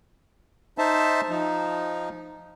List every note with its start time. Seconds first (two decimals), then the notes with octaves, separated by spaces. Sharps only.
0.78 D#4 C5 E5 A5
1.29 F3 D#4